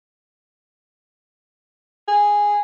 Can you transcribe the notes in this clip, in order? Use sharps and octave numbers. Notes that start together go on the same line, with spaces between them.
G#4